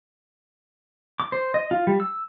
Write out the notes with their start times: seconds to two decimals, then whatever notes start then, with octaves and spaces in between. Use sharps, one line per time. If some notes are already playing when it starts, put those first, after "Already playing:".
1.20 D6
1.32 C5
1.54 D#5
1.71 F4
1.87 G3
2.00 E6